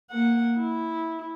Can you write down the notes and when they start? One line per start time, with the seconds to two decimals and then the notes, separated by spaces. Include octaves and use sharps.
0.11 A#3 F#5
0.58 E4